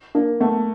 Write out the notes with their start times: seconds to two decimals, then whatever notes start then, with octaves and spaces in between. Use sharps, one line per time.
0.15 A#3 D4
0.41 A3 B3